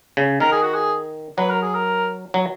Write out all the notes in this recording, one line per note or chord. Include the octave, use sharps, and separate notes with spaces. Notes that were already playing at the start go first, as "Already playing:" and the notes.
C#3
D#3 A#4
G#4
F#4
G#4
F#3 B4
A#4
G#4
A#4
F#3